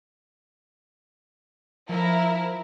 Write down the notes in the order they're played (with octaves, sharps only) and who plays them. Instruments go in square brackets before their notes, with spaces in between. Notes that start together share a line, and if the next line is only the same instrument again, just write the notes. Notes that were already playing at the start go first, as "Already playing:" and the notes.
[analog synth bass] F3 [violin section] E4 A#4